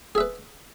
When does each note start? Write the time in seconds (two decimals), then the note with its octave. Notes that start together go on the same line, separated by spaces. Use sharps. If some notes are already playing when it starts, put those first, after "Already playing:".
0.15 G#4
0.18 E5
0.21 B4